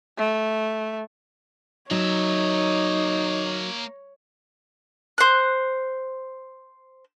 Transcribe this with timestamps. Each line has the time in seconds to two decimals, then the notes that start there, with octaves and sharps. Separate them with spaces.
0.18 A3
1.91 F#3 A#3 D#4 C#5 E5
5.18 C5 F#6